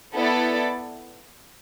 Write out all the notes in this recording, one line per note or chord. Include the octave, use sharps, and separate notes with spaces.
B3 E4 A4 D5